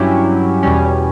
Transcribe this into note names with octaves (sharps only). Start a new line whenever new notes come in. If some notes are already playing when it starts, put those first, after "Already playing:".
Already playing: G2 F#3 C#4 E4 G4
E2 B2 G3 C#4